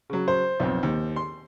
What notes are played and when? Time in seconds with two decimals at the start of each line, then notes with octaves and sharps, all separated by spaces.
0.10 C#3 F#3
0.28 C5
0.60 B1 F2
0.83 D#2
1.16 C6